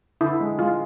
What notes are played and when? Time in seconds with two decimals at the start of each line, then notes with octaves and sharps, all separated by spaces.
0.21 D3 E4
0.40 G#3
0.59 G#3 F4